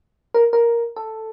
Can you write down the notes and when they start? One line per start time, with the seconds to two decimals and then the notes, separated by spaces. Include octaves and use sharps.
0.34 A#4
0.53 A#4
0.96 A4